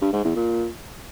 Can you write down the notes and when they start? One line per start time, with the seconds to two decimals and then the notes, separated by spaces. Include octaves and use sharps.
0.01 G2
0.13 G#2
0.24 E2
0.36 A#2